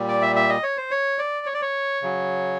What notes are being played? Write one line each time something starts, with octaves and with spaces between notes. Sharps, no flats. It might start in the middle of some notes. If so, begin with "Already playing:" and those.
Already playing: A#2 G3
D5
E5
E5
D#5
C#5
C5
C#5
D5
C#5
D5
C#5
C#3 F#3